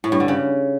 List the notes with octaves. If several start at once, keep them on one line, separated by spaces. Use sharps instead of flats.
A2
G2
D3
C#3